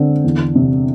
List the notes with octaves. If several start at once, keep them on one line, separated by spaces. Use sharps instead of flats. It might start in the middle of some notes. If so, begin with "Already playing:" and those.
Already playing: D3 C4
E2
C3